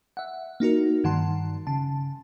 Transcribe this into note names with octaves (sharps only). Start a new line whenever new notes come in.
E5 F#5
A#3 D#4 F#4 A#4
G2 D#3 F#5 A5 C6
C#3 A5